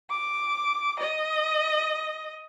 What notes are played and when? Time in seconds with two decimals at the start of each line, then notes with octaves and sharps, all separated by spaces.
0.10 D6
1.00 D#5